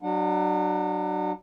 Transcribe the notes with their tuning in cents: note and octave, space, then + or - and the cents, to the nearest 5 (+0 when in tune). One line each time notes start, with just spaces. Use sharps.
F#3 +25 D4 +35 F#5 -25